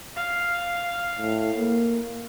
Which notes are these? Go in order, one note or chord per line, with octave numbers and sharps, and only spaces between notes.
F5
A2
A#3